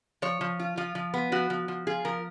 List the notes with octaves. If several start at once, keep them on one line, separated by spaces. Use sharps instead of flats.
F3 C#5
F3
F4
F3 F4
F3
B3
F3 F#4
F3
F3
F4 G#4
F3 A#4